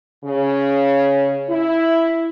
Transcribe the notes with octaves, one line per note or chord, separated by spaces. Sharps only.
C#3
E4